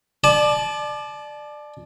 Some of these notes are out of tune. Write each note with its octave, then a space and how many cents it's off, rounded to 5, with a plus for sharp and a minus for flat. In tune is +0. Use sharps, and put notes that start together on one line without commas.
D5 +20 A5 -30